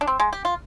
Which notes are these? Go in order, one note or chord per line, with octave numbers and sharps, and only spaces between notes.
D4
C4
G#3
G4
F4